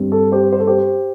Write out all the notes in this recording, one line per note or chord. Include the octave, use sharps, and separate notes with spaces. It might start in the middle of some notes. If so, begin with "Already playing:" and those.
Already playing: G2 G3 C4
A4
G4 C5
C5
A4
G4 C5